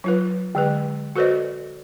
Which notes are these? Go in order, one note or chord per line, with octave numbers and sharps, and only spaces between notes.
F#3 F4 B4
D3 G#3 B4
F#4 A4 B4 C5 D5 D#5